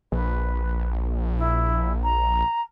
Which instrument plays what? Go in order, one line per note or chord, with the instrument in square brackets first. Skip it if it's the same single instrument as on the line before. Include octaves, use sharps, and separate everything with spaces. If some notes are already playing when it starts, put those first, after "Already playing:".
[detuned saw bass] A#1 [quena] B4
[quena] E4
A#5